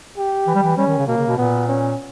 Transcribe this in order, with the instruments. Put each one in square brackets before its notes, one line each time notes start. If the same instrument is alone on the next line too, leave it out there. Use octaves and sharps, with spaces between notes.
[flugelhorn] G4
[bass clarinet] E3
G3
E3
[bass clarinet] G3 [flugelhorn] C#4
[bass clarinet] D#3
C#3
[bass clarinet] B2 [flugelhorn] A#3
[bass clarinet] C#3
B2
[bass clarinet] A#2 [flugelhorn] B3
[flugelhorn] C#4